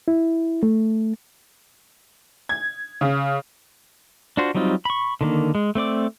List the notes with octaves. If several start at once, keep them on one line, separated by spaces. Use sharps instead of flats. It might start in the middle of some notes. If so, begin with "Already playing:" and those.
E4
A3
G#6
C#3
D4 F4 F#4 C5
F#3 G3 C4 D#4 F4
B5 C#6
D3 D#3 A#3
G#3
A3 C4 D5 D6